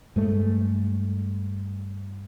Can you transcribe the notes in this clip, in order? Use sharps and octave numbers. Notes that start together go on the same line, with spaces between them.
G2 G#3 A3